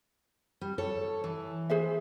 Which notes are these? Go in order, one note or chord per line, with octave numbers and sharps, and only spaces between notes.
G3
A4 C#5
E3
G#4 C5 E5